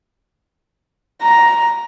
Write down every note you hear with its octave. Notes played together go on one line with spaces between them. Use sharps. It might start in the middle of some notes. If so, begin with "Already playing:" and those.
A#5